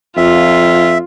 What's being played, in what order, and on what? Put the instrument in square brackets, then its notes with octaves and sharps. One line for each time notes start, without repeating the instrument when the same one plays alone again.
[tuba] F2 [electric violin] F4 [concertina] E5